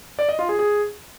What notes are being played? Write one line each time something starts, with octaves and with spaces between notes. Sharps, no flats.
D5
D#5
F4
G#4
G#4